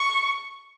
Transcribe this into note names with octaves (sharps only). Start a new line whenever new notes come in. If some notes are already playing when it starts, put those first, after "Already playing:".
Already playing: C#6